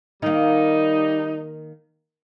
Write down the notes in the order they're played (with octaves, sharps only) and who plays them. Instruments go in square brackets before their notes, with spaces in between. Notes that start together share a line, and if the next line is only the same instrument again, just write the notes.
[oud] D#3 A#3 [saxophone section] G3 D#4